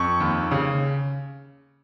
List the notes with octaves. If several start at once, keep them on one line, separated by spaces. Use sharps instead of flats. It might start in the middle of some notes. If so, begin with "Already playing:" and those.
Already playing: F2 C#6
D#2
C#3